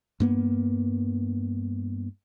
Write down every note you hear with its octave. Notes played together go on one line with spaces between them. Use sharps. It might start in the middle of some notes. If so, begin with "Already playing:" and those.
G2 A#3 B3